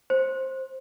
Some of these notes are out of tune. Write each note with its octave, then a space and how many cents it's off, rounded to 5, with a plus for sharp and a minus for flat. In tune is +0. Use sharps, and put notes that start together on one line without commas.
C5 +15